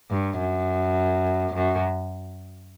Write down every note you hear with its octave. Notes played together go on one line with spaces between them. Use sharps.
G2
F#2
F#2